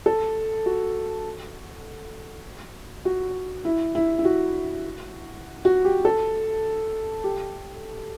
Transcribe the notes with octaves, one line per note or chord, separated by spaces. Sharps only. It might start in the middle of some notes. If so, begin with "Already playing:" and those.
A4
F#4
F#4
E4
E4
E4
F#4
F#4
G4
A4
G4